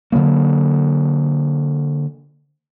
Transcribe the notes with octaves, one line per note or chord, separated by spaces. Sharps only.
D3 E3 F#3 A#3